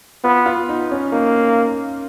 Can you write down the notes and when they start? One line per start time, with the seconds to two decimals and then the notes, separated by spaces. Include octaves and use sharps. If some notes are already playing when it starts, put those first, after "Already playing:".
0.24 B3 F4
0.46 F4
0.69 D#4
0.91 C#4
1.12 A#3 D#4